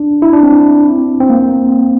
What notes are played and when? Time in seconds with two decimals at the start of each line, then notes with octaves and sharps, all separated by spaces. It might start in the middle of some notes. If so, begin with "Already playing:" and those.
Already playing: D4
0.22 E4
0.33 D4
0.43 C4
1.20 C4
1.30 A#3